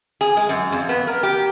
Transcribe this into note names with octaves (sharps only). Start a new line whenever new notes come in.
G#4
G#3
F#2
F2
B3
A#4
G4